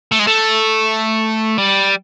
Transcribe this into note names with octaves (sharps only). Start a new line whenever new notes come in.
A3
G#3
A3
G3